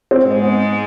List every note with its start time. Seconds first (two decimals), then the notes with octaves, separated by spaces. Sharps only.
0.11 C4
0.27 G#2 G#3
0.42 B3